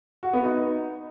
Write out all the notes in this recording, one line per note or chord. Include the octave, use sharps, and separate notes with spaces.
F#4
B3
D#4